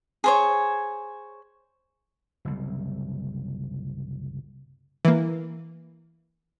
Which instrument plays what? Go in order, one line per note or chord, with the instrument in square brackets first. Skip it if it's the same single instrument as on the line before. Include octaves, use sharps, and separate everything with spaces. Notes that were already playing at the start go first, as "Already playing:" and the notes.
[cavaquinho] G#4 C5 C#5
[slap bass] F#1 C2
[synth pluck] E3 A#3